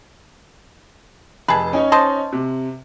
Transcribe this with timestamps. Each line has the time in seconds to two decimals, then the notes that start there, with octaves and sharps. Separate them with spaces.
1.48 F1 G#4 B4 A5
1.73 C#4 D#4 C#5
1.92 C5 D#5 A5
2.33 C3